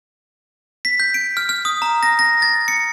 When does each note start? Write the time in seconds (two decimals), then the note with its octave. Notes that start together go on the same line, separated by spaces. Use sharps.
0.85 B6
1.00 G6
1.14 D7
1.37 F6
1.49 F6
1.65 D#6
1.82 A#5
2.03 A#6
2.19 A#6
2.42 A6
2.68 C#7